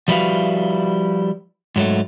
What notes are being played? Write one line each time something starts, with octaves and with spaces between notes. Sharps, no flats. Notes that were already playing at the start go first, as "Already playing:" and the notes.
F3 G3 E4 F#4 B4 F5
G#2 F#3 A3